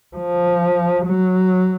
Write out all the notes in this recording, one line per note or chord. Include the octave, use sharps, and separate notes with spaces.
F3
F#3